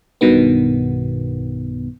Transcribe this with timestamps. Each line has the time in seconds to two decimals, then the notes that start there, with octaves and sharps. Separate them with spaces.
0.21 B1 G2 B2 D#3 B3